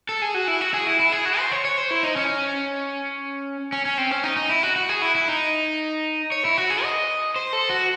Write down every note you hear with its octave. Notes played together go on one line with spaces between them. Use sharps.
A4
G#4
F#4
E4
F#4
G#4
E4
E4
G#4
F#4
C5
C#5
C#5
C5
E4
D#4
C#4
C#4
C#4
C4
C#4
D#4
D#4
E4
F#4
F#4
G#4
E4
E4
D#4
C#5
E4
F#4
G#4
D#5
C5
A4
F#4